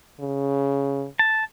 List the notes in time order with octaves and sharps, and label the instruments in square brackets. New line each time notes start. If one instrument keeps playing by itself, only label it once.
[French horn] C#3
[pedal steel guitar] A5